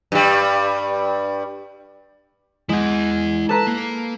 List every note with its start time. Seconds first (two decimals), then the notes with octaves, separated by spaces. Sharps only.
0.12 G2 G3
2.69 G#3 E4 F#5 G#6
3.49 A4 B4 A5 A#5
3.67 A#3